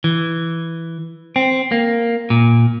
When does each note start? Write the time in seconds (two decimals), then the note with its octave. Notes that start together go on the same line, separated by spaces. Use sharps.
0.04 E3
1.36 C4
1.72 A#3
2.30 A#2